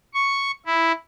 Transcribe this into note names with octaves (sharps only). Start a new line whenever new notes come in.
C#6
E4